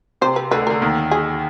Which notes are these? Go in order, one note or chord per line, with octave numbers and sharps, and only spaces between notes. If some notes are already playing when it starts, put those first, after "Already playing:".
C3 C5
B4
D2 D3 B4
D3 A#4
D#2 D#3
G#4